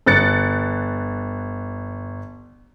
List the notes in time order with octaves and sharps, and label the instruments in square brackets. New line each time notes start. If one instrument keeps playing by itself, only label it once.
[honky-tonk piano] G1 F#6 A6 C#7